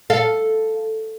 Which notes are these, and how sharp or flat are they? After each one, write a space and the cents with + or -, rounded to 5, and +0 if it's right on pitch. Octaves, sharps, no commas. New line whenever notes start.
A4 +0 F5 +0